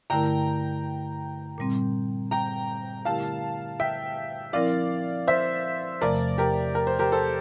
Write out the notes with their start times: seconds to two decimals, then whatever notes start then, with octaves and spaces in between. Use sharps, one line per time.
0.10 G2 D3 A3 E4 A#4 G5 A#5
1.58 A#2 G3 C4
2.31 G5 A#5
3.05 D3 A3 E4 G4 A#4 F5 A5
3.80 E5 G5
4.53 F3 C4 E4 A#4 D5 F5
5.28 C5 E5
6.01 E2 C3 F3 A3 A#4 D5
6.38 G4 A#4
6.75 A#4
6.87 C5
6.99 G4 A#4
7.12 A4 C5